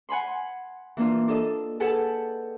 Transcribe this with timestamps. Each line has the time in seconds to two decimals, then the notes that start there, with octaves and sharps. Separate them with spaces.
0.09 F#5 G#5 B5 C6
0.97 E3 A#3 D4 F4
1.28 D4 A4 D#5
1.80 G#4 A4 B4 F#5 G5 A5